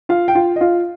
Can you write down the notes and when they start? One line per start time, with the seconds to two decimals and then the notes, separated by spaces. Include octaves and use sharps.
0.09 F4 F5
0.28 G5
0.35 F4 F5
0.56 D#5
0.61 F4 F5